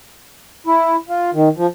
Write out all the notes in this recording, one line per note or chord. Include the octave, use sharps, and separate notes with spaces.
E4
F4
D#3
F3